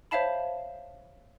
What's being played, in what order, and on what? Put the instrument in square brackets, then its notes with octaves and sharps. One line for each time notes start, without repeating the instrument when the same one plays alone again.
[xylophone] C5 C#5 E5 F5 A5 B5